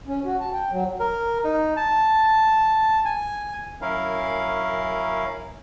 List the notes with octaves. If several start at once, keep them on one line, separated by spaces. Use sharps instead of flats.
C#4
F#4
A5
G5
F#3
A#4
D#4
A5
G#5
F#2 C#4 E4 A#4 F5